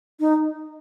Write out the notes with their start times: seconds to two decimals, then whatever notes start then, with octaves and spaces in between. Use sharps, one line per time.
0.20 D#4